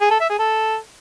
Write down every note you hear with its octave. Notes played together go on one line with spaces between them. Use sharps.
G#4
A4
E5
G#4
A4